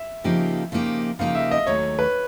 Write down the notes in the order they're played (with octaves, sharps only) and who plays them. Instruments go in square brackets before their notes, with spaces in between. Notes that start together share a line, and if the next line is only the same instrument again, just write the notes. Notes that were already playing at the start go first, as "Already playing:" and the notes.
Already playing: [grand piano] E5
[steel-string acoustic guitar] C#3 F3 A#3 D#4 G4
C#3 F3 A#3 D#4 G4
[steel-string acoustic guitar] C#3 F3 A#3 D#4 G4 [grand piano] F5
[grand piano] E5
D#5
[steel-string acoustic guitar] D#2 D#3 F#3 A3 [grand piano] C#5
[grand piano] B4